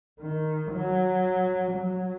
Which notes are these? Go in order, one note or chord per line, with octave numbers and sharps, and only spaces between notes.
D#3
F#3
F#3